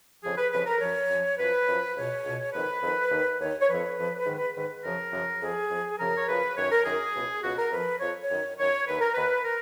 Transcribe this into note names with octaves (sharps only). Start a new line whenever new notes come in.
F2 C#3 F3 G#4
B4
F2 C#3 F3 B4
A#4
F#2 F3 C#5
F#2 F3
F#2 F3 B4
F#2 F3
C#2 B2 C#5
C#2 B2
F2 D#3 B4
F2 D#3
D#2 D#3
D#2 D#3 C#5
C#5
F2 F3 B4
F2 F3
G#2 D#3
G#2 D#3
F#2 C#3 F3 A#4
F#2 C#3 F3
F2 F3 G#4
F2 F3
F#2 C#3 F3 A#4
C#5
F#2 C#3 F3 B4
F#2 D#3 C#5
A#4
F#2 D#3 G#4
C#2 B2
C#2 B2 F#4
A#4
F2 F3 B4
F2 F3 C#5
C#5
F#2 D#3
F#2 D#3 C#5
D#2 D#3 B4
A#4
D#2 D#3 B4
A#4